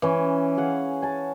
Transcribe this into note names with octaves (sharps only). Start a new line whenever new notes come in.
E3 C#4
G#4 F5 F#5
G#5 A5